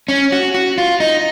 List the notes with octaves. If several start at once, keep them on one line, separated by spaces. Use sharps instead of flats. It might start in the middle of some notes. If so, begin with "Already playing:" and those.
C#4
F#4
F#4
F4
D#4